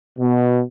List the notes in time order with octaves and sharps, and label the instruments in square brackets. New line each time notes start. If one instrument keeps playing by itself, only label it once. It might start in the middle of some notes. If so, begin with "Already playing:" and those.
[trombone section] B2